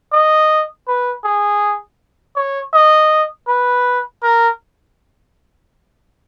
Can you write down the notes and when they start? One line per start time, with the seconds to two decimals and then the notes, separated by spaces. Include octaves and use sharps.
0.13 D#5
0.88 B4
1.24 G#4
2.36 C#5
2.73 D#5
3.48 B4
4.23 A#4